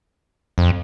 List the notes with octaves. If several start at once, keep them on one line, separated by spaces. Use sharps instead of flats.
F2